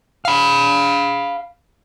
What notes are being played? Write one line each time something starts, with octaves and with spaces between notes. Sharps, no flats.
F5 B5